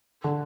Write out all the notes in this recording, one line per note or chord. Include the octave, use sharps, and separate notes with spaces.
D3